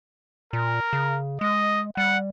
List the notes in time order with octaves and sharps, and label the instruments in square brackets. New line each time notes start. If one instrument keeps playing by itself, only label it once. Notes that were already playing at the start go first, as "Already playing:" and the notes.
[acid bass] A#2 [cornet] A#4
[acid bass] C#3
[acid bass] G#3 [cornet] D#5
[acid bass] G3 [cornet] F#5